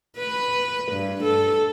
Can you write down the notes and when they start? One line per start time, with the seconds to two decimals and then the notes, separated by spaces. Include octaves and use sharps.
0.18 B4
0.93 G2
1.23 A4